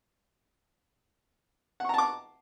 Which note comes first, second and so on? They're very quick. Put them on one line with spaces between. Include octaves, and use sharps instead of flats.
F#5 C#6 A#5 A5 D6